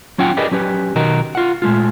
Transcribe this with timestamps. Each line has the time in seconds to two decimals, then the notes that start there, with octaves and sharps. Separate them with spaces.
0.18 F#3 C#4 F4 F#5 G5
0.37 G4 G#4 A#4 B4 D5 D#5
0.51 F#3 C#4 G4 B4
0.95 B1 D#3 F#4 A#4 D#5
1.35 F4 F#5
1.62 A#2 G#3 A3 F4